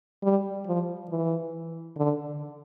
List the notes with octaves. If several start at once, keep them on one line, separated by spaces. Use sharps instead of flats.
G3
F3
E3
D3